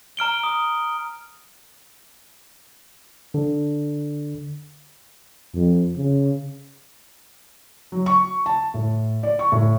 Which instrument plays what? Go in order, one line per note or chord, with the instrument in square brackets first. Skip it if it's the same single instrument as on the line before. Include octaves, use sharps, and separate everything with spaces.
[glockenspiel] A#5 F6 D7 G7
D#6
[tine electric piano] D3
[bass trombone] F2
C#3
[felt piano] F#3
C#6
A5
A2
D5
C#6
A2